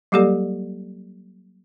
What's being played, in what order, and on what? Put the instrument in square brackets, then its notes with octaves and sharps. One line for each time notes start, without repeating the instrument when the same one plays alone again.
[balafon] F#3 G3 A#3 G4 A4 D5